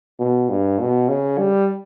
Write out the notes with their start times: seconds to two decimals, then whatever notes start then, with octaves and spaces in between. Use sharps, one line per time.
0.20 B2
0.49 G2
0.79 B2
1.09 C#3
1.38 G3